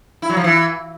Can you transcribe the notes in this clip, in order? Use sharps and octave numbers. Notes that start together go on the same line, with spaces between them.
E4
F#3
F3
E3